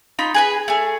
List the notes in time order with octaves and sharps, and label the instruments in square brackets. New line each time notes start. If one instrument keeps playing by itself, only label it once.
[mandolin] D#4 F4 B5
G#4 B4 B5
A3 G#4